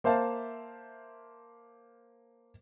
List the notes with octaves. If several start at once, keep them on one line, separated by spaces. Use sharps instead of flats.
A#3 C5 E5 F5 A5